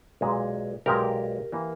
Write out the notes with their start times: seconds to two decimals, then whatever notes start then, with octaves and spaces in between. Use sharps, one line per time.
0.21 B1 A#2 G#3
0.86 B1 A#2 G#3 G4 A#4
1.52 E3 A#3